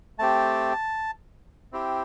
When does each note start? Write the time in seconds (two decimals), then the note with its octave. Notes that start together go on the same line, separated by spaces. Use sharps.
0.19 A3 C4 G4 A5
1.73 C4 E4 G4